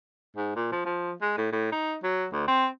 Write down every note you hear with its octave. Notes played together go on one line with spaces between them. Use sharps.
G#2
A#2
F3
F3
G#3
A2
A2
D#4
F#3
D2
C4